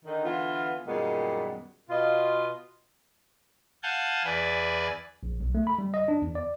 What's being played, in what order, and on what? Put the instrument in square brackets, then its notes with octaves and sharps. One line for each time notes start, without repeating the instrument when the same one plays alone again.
[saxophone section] D3 D#3 D#4
D3 E3 B3 F4
F#2 A#2 D#3 G3 G#3 B3
B2 F4 D#5
[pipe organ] F5 F#5 G#5 A5 G6
E2 B4 D5 G#5
[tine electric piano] A#1
B1
A3
B5
G3
D#5
D4
E2
D5